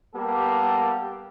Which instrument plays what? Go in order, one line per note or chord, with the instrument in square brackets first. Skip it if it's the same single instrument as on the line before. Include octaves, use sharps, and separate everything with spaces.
[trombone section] G3 A#3 B3 G4 A4